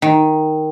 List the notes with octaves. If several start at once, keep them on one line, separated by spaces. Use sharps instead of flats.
D#3